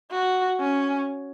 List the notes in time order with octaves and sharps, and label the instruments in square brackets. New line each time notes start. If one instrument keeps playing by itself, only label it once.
[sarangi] F#4
C#4